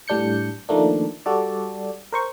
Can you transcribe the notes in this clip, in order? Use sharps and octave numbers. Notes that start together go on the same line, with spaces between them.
A2 G3 D4 G6 C#7
D#3 F3 A3 A#3 D4
G3 F#4 A4 D5
A#4 C5 C#6